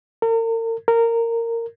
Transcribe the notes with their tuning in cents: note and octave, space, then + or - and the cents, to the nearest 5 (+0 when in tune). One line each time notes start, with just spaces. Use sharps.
A#4 -40
A#4 -15